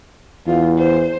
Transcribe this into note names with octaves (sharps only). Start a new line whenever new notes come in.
E2 F4
C5